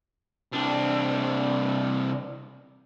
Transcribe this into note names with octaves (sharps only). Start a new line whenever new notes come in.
C2 D4